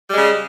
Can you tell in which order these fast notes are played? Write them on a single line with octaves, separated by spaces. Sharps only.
G3 G#3 C#3